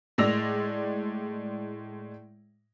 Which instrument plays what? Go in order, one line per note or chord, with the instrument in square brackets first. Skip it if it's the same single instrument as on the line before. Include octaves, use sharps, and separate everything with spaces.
[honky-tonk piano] A2 G#3 D5 E6 A#6 F7